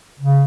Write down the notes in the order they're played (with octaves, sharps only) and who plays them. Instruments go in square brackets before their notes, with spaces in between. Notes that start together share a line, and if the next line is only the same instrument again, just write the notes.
[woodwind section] C#3